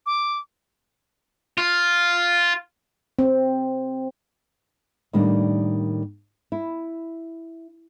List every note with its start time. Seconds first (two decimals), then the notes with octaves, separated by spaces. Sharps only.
0.06 D6
1.58 F4
3.19 C4
5.13 A2 D#3 G3 A#3 D4
6.52 E4